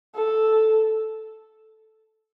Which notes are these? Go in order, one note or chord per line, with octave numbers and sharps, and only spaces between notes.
A4